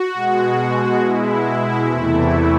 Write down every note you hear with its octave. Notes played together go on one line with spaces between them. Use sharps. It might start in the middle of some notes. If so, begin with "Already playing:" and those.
Already playing: F#4
B2 G#3
B2 G#3 E4
E2 C3 E3 A3